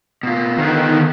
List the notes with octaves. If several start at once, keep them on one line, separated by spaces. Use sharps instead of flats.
B2 F4
D3 D#3 B3